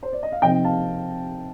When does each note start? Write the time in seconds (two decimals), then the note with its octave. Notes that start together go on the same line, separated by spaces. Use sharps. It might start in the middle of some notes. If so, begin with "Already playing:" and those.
0.03 C5
0.12 D5
0.23 D#5
0.32 F5
0.42 C3 F3 C4 D#4 D#5 G5
0.64 F5 A5